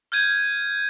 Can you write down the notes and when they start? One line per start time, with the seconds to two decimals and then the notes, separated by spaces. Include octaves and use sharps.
0.12 F6 G6 G#6 D#7